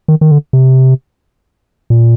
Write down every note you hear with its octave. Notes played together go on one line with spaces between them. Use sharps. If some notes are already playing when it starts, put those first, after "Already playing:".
D#3
D#3
D3
C3
A#2